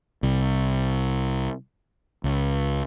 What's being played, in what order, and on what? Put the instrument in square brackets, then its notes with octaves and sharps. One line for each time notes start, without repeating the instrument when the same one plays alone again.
[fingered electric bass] C2
C#2